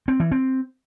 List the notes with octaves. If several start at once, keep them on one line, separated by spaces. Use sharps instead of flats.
C4
E3
C4